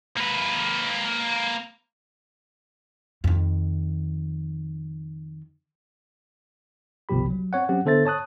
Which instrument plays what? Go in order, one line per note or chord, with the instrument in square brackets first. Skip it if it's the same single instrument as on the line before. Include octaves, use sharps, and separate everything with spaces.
[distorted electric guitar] A#3 B4
[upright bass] F2 D#3
[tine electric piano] G1 C2 B2 F3 G4 B5
F#3
C4 C#5 F#5
F#3 C4 C#4 G4 F#5
D3 B3 A4 C5 E5 A6
C#5 A5 D#6 F#6